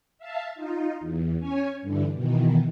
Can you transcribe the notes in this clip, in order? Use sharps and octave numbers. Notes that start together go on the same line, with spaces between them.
E5 F5 A5
D#4 F4
E2
C#4 C#5 G#5
G2 D3 E3
B2 D#3 E3